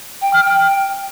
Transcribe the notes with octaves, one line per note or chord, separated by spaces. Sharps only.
G5
F6
G5